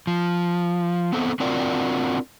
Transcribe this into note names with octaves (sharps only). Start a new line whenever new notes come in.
F3
B3 C4 A4
C4 D4 F4 F#4 A#4 D5